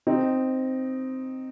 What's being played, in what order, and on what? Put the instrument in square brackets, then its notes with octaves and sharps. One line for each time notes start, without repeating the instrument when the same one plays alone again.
[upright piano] C4 D#4